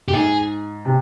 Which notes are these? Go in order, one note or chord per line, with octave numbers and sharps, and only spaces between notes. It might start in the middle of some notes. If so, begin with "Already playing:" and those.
G4
G#2 G#4
C3